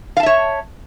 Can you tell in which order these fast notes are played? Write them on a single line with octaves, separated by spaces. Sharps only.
F5 A5 E5 C#5